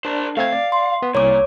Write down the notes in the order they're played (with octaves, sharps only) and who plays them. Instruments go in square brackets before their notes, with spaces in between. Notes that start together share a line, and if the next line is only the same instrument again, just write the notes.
[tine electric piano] D4 [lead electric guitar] A#4 C5
[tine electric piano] A3 C4 G#6 [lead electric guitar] F5
[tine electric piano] D5
[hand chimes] C6
[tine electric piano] B3
[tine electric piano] C2 [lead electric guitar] A#2 [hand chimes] C#5 D6